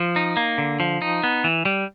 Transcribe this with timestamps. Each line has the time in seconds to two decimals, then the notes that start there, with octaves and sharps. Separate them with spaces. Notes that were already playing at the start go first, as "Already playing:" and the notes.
Already playing: F3
0.16 D#4
0.37 A#3
0.58 D3
0.80 F3
1.02 D#4
1.24 B3
1.44 E3
1.65 G3